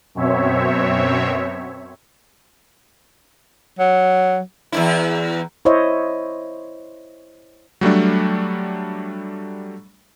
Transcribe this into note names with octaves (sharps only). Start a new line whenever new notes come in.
F#2 B2 C4 C#5 E5
F#3
E2 G#2 E4
E4 C5 C#5 D#5 E5
F#3 G3 A3 D4